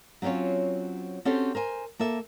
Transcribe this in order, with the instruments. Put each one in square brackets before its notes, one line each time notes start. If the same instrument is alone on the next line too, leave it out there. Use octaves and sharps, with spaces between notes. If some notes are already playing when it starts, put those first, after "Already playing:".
[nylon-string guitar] F#3 C4 C#4 F4 C#5
C4 C#4 F#4 G4 A4 C5
A#4 C5 G#5
A#3 A4 E5